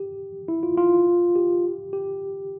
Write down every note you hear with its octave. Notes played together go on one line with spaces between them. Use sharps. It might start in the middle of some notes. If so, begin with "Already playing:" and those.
Already playing: G4
E4
F4
F4
G4
G4